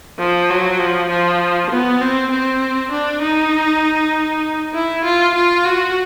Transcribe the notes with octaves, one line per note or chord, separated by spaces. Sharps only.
F3
F#3
F3
F3
B3
C4
C4
D4
D#4
E4
F4
F4
F#4